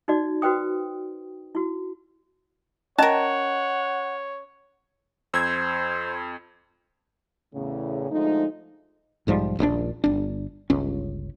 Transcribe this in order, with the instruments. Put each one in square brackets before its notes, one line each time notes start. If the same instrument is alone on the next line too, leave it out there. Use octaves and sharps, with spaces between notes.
[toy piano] D#4 F#4 D5
F#4 B4 C5 G5 D#6
E4 F#4
[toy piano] C#4 D#5 A#5 [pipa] A#4 A5 [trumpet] C#5 [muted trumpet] F#5
[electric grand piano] F2 [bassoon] C5 [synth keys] E6 G#6
[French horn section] E2 A2 C#3
D2 F3 G#3 A3 D#4
[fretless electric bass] B1 G#2 F3 G3
D#1 A#1 A2 D4
G1 D4
G1 C#2 C#4